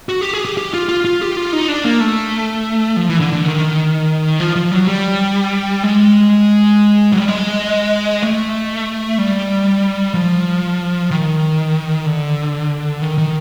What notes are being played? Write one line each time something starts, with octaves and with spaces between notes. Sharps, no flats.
F#4
G4
G#4
G4
G4
F4
F4
F4
G4
F4
D#4
D4
A#3
A3
F3
E3
D3
D3
D#3
F3
F3
F#3
G3
G#3
F#3
G3
G#3
A3
G3
F3
D#3
D3
D#3
D#3